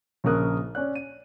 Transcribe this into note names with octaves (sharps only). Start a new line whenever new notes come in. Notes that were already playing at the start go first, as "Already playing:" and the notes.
A#1 C#3 A#3 A#4 D#6 F#6
C#4 D5 F#6
D#7